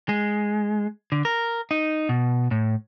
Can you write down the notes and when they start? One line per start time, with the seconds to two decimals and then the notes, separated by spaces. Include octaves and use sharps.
0.09 G#3
1.12 D3
1.25 A#4
1.71 D#4
2.09 B2
2.51 A2